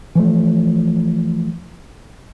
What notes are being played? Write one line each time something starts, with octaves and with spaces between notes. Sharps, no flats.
E3 F3 A3